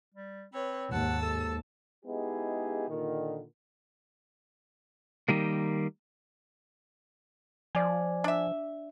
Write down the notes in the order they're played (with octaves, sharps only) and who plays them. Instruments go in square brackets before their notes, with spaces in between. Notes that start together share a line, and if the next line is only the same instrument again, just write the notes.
[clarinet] G3
[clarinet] C4 [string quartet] B4 C#5
[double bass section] D#2 G#2 [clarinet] F#5 [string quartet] A5 E6
[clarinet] A4
[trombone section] G#3 B3 D#4 E4 G4 G#4
A#2 D3 D#3
[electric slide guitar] D#3 G3 A#3
[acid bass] F3 [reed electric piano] D5 G#5
[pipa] D4 E5